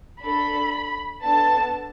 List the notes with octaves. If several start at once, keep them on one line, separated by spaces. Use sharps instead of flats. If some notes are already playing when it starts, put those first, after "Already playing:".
D4 A4 B5
B3 D4 A4 A5